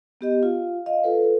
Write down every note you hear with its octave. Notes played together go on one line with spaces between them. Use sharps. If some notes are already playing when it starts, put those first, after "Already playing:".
B3 G4 D#5
F4 F5
D#5 F5
F4 A4 B4